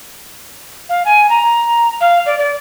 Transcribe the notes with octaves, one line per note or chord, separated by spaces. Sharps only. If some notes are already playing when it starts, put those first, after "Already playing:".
F5
G#5
A#5
F5
D5
D5